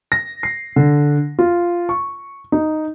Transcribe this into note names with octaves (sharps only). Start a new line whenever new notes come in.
A#6
C7
D3
F4
C#6
D#4